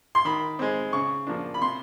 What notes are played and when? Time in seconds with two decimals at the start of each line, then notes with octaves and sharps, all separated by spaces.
0.15 C6
0.25 D#3 B5
0.59 G#3 C4
0.93 C#3 C#6
1.27 F3 A#3 D4
1.54 B5
1.61 C3 C6